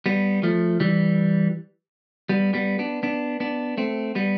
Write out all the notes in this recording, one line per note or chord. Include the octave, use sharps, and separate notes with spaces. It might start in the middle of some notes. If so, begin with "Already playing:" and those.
G3 B3
F3 A3
E3 G3
G3 B3
G3 B3
B3 D4
B3 D4
B3 D4
A3 C4
G3 B3